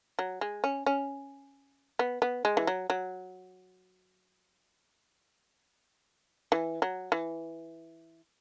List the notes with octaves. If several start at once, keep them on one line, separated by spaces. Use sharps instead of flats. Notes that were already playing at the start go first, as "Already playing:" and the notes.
F#3
G#3
C#4
C#4
B3
B3
G#3
E3
F#3
F#3
E3
F#3
E3